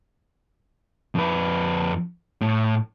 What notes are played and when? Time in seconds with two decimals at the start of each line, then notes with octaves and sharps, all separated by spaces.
1.15 F2 B4
2.41 A2